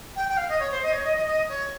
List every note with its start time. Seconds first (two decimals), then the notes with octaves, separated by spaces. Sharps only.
0.15 G5
0.29 G5
0.37 F5
0.48 D#5
0.59 C#5
0.71 C5
0.82 D#5
0.93 C#5
1.04 D#5
1.15 D#5
1.26 D#5
1.49 C#5